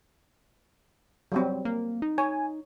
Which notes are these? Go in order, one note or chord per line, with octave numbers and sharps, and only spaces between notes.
F#3 G3 C4
A#3
D#4
C#5 G#5